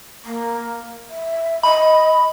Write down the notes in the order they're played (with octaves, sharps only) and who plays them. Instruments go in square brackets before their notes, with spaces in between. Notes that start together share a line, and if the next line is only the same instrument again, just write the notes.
[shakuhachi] A#3
E5
[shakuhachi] D#5 [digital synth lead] B5